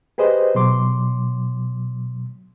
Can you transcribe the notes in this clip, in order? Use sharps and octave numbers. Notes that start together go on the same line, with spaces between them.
G4 G#4 B4 C5 D#5
B2 F#3 C6 D6